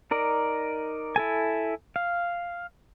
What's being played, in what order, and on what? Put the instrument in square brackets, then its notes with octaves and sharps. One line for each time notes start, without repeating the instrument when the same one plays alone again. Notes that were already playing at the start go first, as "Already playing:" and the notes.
[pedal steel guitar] D#4 A#4 D5
E4 A4 G#5
F5